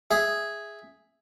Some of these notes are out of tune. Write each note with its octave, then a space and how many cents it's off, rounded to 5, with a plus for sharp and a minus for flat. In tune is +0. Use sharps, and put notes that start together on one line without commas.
G#4 +0 E5 +0